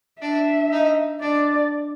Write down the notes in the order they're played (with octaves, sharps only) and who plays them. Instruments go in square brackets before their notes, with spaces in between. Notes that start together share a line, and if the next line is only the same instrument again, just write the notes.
[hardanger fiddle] D4 [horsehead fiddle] E5
[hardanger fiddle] D#4
[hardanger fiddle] D4 [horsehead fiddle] D5